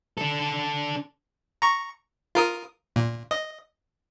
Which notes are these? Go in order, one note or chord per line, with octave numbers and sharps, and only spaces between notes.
D4 A4
A#5 C#6
F4 A#4 D#6
A#2
D#5